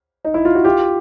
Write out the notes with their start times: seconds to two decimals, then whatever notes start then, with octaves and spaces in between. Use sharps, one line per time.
0.25 D#4
0.34 E4
0.45 F4
0.55 F#4
0.64 F4 G4